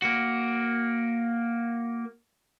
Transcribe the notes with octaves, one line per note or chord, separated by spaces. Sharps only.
A#3 F#4